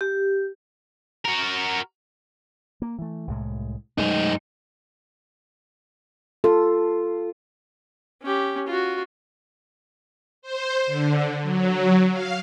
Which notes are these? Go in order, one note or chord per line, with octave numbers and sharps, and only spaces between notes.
G4
F#4 A#4
A#3
E3 A3
C2 A2 G#3
F#2 G#3 A3 D#4
F4 A4
C#4 G4
F4 F#4
C5
D3
F#3
F5